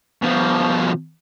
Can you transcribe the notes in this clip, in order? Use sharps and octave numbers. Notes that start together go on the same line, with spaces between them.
B2 F3